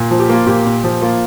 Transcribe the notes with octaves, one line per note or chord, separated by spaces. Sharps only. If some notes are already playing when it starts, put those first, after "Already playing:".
Already playing: A#2
F3
G4
A#3 F4
A#2 G4
A#2
F3
A#3 F4